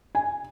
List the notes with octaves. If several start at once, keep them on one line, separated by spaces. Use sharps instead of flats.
G#5